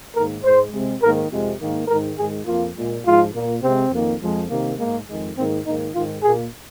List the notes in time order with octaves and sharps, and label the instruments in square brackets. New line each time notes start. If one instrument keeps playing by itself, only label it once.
[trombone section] G#2 D#3 A#3 A#4
G#2 G#3 C5
C3 G#3
G#2 D#3 A#3 A#4
F2 C3 F3 G#3
G#2 D#3 A#3
G#2 D#3 G#3 A#4
G#2 D#3 G#3 G#4
F2 F3 A#3 F4
A#2 G#3
G#2 F3 G#3 F4
A#2 A#3
C3 G#3 C4
F2 D#3 A#3
F2 F3 G#3
C3 D#3 A#3
G#2 G#3 A#3
F2 D#3 G#3
G#2 D#3 A#3 C4
G#2 D#3 A#3 D#4
G#2 D#3 G#3 F4
A#2 A#3 G#4